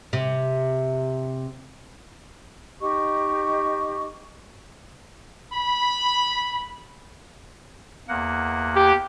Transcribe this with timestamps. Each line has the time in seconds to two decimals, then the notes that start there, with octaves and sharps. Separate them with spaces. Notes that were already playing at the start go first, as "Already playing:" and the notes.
0.13 C3
2.81 D#4 G4 D#5 C#6
5.52 B5
8.08 E2 A#3 F#5
8.75 G4